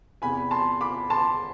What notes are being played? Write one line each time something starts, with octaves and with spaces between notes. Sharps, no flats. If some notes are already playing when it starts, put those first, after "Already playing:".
E2 C3 E3 G#5 B5
A5 C6
B5 D6
A5 C6